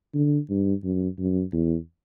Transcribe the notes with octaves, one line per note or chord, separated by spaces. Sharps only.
D3
G2
F#2
F#2
E2